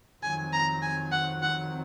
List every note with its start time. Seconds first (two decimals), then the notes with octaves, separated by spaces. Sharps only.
0.23 F2 D#3 F#3 C4 G#5
0.53 A#5
0.82 G#5
1.12 F#5
1.42 F#5